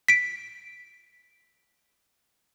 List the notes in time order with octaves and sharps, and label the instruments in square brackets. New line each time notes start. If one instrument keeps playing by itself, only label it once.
[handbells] B6 D7